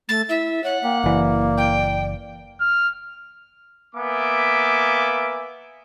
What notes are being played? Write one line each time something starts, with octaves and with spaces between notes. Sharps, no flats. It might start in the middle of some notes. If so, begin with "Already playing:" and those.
A3 A6
E4 E5
C#5 F#5
A#3 G5
F#1 E3 D5
G5
F6
A#3 B3 E5 G#5 D6